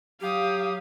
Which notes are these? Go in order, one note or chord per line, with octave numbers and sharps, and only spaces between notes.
F#3 G4 F5 D#6